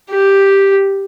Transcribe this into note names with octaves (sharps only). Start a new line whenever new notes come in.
G4